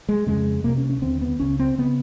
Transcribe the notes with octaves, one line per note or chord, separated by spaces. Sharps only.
G#3
F2 C#3 G#3
C2 C3 A#3
C#4
C#4
D#2 D3 C4
B3
C#2 C#3 C#4
C4
C#3 B3